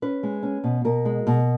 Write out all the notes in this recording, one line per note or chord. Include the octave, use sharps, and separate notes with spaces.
C#4 B4
G#3
C#4
B2
B2 A#4
G#3
B2